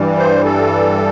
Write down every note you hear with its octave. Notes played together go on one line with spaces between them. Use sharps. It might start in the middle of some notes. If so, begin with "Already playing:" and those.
Already playing: G2 E3 G3
C5
A4